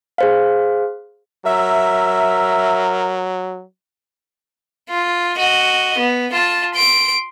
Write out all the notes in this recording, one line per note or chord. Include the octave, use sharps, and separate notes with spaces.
G#4 C5 F5
F#3 A#4 E5
F4
F#4 D#5
B3
F4 A5
C6 D7